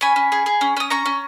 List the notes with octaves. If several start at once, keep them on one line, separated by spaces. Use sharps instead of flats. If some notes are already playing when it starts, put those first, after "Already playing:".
C#4 G#5 B5
C#4
G#4
G#4
C#4
C#4 D#6
C#4 A#5 C#6
C#4